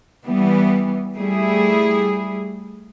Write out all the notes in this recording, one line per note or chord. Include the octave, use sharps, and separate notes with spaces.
E3 G3 B3
G3 A3 E4 G#4